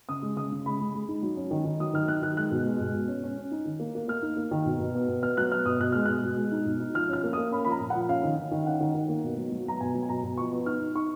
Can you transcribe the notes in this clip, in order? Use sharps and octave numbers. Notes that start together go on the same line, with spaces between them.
C#3 D#6
G#3
C#3 D#6
C#3
G#3 B5
G#3
G#3
D#4
F#3
C#4
D#3
D#3
F#3 D#6
D#3 F6
F#3 F#6
D#3 F#6
G#3 F#6
B2
G#3
B2
B2
C#4
C#4
C#4
D#4
D#3
A#3
A#3
A#3 F6
D#4
A#3
D#3
B2
B2
B3
B2
B3 F6
F#3 F#6
B3 F6
B2 D#6
B2 F#6
G#3 F6
B2 F#6
B2
G#3
D#4
B2
D#4
F3 F6
C#4 F6
A#3
D#6
A#3
C#4 B5
F3 B5
A#5
A#2
F#5
F3
C#4 F5
D#3
D#3
D#3
C#4 F#5
D#3
D#3
A#3
B2
F#3
F#3
B3 A#5
B2 G#5
F#3
G#5
B2 A#5
B2
F3 C#6
B3
D#4 F6
D#4
D#4 C#6